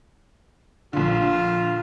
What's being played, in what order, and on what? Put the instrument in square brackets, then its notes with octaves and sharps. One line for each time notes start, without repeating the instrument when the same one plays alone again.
[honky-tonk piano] A#1 D3 [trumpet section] F4